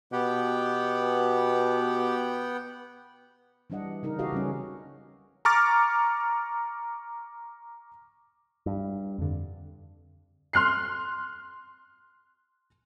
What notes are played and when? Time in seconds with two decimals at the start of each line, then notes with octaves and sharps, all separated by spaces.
0.12 B2 B3 G4 F#5 G5
3.70 E3 G3 D4 D#5 F#5
4.03 C#3 E3 D#4 A#4
4.19 F#4 G4 A4 D#5 F5
4.32 C#3 G3 C#4
5.45 A#5 C#6 D6 F6 A6
8.66 G2
9.18 F2 D3
10.53 C6 F6 F#6 C7